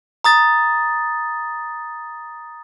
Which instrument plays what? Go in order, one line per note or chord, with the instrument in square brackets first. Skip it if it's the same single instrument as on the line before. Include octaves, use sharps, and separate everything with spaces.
[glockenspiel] A#5 D#6 A6